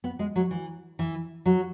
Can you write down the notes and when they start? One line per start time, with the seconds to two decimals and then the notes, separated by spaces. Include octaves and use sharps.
0.04 B3
0.19 G#3
0.36 F#3
0.51 E3
0.99 E3
1.46 F#3